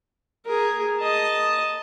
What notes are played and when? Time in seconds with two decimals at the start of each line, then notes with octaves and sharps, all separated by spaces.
0.46 G#4 A#4
1.00 D#5 A5